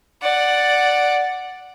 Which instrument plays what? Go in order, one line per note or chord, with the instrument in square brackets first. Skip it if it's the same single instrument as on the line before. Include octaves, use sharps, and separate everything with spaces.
[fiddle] D5 F#5